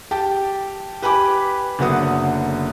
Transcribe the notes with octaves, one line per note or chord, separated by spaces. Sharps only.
G4 G5 A5
G4 B4 G#5 B5 D6
F#1 D3 F#3 B3 D#6